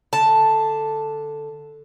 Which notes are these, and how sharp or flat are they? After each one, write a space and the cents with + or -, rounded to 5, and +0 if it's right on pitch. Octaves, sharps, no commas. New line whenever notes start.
D3 +0 A5 +0